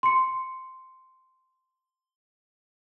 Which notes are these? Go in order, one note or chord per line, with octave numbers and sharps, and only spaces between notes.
C6 C#7